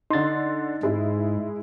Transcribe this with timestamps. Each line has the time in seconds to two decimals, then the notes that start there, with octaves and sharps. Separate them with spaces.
0.10 D3 D#4 C6 A6
0.83 G#2 G#3 E4